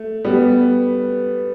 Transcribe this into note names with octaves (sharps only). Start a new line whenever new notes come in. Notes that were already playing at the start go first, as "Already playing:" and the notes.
Already playing: A3
G3 B3